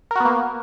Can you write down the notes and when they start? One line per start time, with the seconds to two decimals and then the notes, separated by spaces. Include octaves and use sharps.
0.11 A#4
0.16 F#4
0.20 B3
0.25 A#3